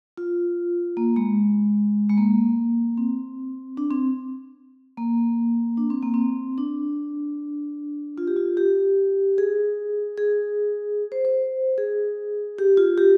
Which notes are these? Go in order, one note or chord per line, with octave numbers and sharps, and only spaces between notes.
F4
A#3
G#3
G#3
A#3
C4
D4
C4
A#3
D4
C4
A#3
C4
D4
F4
G4
F4
G4
G#4
G#4
C5
C5
G#4
G4
F4
G4